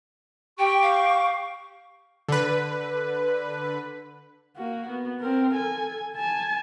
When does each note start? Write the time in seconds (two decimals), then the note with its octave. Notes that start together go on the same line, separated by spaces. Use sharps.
0.58 G4 G5 C#6
0.82 F5
2.29 D3 B4
4.57 A#3 F#4
4.89 B3
5.20 C4 A#4
5.55 A4 G#5
6.15 G#5 A5